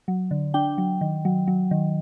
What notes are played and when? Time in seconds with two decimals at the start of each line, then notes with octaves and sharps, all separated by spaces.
0.08 F#3
0.31 D3
0.54 D4 G5
0.78 F#3
1.01 D#3
1.25 F#3
1.48 F#3
1.71 D#3